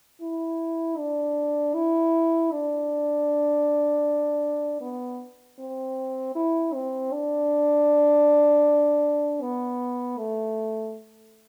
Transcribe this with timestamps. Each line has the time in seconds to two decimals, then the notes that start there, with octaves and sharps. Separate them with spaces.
0.21 E4
0.98 D4
1.74 E4
2.52 D4
4.81 B3
5.59 C4
6.35 E4
6.74 C4
7.12 D4
9.41 B3
10.18 A3